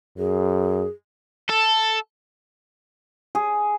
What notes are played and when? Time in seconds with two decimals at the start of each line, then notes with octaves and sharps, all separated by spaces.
0.18 F#2 G#4
1.49 A4
3.35 G#4